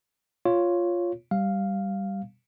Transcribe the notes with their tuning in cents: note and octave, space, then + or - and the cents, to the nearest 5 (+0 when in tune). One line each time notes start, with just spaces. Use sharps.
F4 +0 C#5 +0
G3 +0 F5 +0